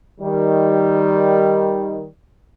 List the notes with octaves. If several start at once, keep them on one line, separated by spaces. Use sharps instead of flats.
D#3 G3